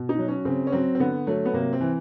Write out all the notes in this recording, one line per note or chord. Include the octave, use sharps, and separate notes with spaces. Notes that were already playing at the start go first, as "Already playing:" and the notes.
Already playing: B2
D#4
F#3
C#4
C#3 C4
C#4
F#3 C4
C4
D3 B3
F#3 A3
B3
C3 A#3
C4
E3